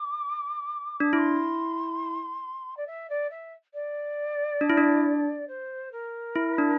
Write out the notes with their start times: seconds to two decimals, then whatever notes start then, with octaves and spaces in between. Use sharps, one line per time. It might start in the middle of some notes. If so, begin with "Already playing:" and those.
Already playing: D6
1.00 D4
1.13 E4 D6
1.18 C6
2.77 D5
2.87 E5
3.10 D5
3.30 E5
3.74 D5
4.61 D4
4.70 E4
4.78 D4
5.48 C5
5.92 A#4
6.35 E4
6.58 D4